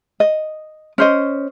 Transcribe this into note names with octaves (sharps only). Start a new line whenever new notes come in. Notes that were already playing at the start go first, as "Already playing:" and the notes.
D#5
C#4 C5 D#5